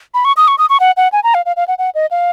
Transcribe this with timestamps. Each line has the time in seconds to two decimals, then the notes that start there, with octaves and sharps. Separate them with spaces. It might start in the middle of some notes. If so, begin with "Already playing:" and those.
0.14 B5
0.25 C#6
0.37 D#6
0.48 C#6
0.58 D#6
0.70 C#6
0.80 F#5
0.97 F#5
1.12 G#5
1.24 A#5
1.34 F5
1.46 F5
1.56 F5
1.68 F#5
1.78 F#5
1.95 D#5
2.11 F5